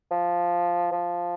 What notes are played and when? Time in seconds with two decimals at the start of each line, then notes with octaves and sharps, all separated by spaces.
0.11 F3
0.92 F3